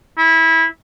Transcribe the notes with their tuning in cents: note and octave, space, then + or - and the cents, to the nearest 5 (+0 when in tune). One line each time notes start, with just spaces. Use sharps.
E4 -20